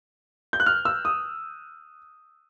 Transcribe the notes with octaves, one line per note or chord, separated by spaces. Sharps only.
G6
F#6
F6
E6
D#6